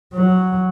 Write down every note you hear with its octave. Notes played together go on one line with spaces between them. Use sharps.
F#3